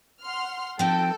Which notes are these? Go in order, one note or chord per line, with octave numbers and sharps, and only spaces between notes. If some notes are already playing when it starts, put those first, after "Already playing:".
F#5 C6 F6
F3 C4 D#4 A4 G5